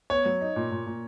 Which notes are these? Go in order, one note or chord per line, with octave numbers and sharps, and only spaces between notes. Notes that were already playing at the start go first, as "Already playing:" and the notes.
B3 C#5
F#3
D#4
A#2
A#2
A#2